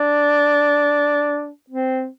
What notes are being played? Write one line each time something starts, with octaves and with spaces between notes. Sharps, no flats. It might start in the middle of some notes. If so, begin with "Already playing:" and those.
Already playing: D4
C4